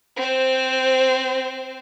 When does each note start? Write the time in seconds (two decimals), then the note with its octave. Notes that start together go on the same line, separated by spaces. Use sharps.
0.16 C4 C5